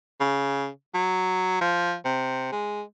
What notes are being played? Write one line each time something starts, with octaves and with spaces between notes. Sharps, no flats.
C#3
F#3
F3
C3
G#3